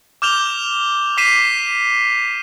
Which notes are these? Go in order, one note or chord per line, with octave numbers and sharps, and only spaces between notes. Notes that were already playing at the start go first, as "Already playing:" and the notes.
D6 F6 G6 E7 F7 G7
D6 B6 C7 D#7 E7